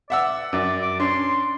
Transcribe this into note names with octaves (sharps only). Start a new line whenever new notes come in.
D5 E5 F#5 E6
F#2 D5
D6
C#4 D4 C6